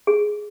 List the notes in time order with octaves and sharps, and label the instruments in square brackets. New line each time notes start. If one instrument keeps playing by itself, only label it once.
[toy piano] G#4